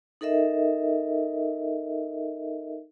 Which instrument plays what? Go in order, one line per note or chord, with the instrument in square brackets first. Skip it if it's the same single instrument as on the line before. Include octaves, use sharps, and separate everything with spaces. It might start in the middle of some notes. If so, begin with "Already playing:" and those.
[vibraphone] D#4 A4 A#4 D#5 E5